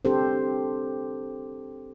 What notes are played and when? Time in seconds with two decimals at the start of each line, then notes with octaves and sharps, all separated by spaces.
0.05 C4 D4 G4 A4 C5